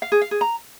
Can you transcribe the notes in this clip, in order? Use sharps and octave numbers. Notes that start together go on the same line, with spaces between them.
F5
G#4
F5
G#4
A#5